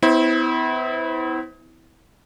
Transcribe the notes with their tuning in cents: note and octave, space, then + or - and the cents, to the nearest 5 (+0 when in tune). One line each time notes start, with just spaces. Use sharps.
B3 +40 E4 -20 C5 +20